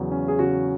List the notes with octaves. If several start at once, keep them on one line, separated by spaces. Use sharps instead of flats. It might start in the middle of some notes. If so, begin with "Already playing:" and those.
Already playing: E2 C#3 F#3
C#4
G#4
C#3 F#4